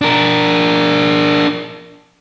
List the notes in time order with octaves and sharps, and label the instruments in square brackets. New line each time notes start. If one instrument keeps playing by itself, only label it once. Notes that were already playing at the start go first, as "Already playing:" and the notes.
[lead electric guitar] D4 A#4